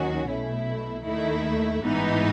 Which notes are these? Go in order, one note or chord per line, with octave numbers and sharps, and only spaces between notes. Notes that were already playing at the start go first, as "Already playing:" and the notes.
Already playing: D#2 D#3 F#3 C#4 F#4
B1 B2 A3 E4
D#2 D#3 A3 E4
A1 G#2 E3 B3 D#4